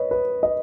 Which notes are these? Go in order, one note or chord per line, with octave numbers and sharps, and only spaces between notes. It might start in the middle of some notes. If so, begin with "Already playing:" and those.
Already playing: B4 C#5 D#5
B4
D#5